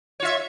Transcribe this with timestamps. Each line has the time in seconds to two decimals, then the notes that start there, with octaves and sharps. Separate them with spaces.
0.20 C#5
0.22 F4
0.25 E5